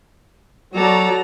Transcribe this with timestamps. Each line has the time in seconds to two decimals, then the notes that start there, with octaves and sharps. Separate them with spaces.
0.74 F#3 A4 D5 A#5